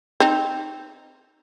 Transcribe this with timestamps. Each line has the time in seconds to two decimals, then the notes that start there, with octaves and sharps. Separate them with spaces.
0.20 C4 D#4